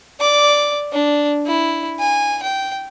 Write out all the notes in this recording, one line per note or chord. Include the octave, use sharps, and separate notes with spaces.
D5 D6
D4
E4
G#5
G5